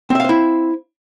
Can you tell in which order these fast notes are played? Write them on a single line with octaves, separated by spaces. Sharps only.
C4 E5 F5 C5 E4